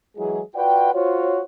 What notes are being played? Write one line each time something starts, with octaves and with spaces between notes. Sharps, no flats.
E3 F#3 G#3 E4 G#4
F4 F#4 B4 D5 F#5 G5
F4 F#4 C5 C#5